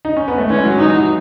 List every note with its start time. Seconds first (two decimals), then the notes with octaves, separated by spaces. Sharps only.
0.05 D#4
0.17 C#4
0.28 B3
0.38 A3
0.50 E3 G#3 C#4
0.64 F#3
0.78 E3 D#4
0.92 F#3